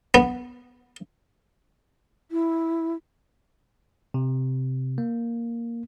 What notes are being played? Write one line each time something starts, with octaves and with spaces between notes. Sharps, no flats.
B3
E4
C3
A#3